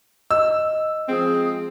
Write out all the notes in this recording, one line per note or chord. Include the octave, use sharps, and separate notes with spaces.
D#5 E6
F3 G#3 C4 G#4